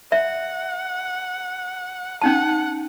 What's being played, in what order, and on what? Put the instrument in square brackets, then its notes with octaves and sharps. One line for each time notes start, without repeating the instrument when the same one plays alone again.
[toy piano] E5 [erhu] F#5
[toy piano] C#4 D#4 A5 [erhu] F#5